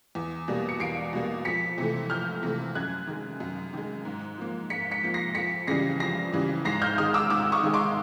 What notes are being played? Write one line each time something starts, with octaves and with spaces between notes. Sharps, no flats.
E2
B2 G3 A#3
C#7
E2 C7 D7
B2 G3 A#3
F2 B6 C#7
C3 E3 A3
F2 F6 G6
C3 E3 A3
F#2 F#6 G#6
D#3 G#3
F#2
D#3 G#3
G#2
F3 A#3
G#2 B6 C#7
B6 C#7
F3 A#3
A#6 C7
F2 B6 C#7
C#3 E3 G3 A#6 C7
F2 A#6 C7
C#3 E3 G3
G#2 A#6 C7
F6 G6
D#3 G#3 D#6 F6
D6 E6
G#2 D6 E6
C#6 D#6
D#3 G#3
C6 D6